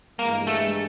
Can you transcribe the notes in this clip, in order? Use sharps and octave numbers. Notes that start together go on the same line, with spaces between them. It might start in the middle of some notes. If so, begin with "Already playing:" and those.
G2 E3 G#3 A#3
A3